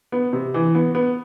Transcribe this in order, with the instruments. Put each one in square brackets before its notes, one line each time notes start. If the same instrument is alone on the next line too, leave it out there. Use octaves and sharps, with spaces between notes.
[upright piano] B3
C3
E3
B3
B3